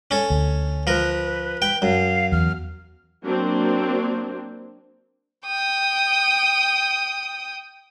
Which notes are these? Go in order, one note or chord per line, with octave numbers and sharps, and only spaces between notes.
C#4 A4
D2
F3 A#4 B4
G5
F#2 F5
E2 F6
F#3 A#3 C4 D4
G5 D#6